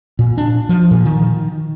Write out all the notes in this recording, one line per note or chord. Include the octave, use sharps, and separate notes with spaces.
A#2
D4
F3
A#2
D#3